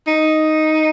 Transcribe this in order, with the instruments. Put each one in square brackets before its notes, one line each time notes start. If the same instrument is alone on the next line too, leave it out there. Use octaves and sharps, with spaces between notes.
[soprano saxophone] D#4